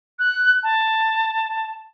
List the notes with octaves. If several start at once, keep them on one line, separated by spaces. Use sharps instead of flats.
F#6
A5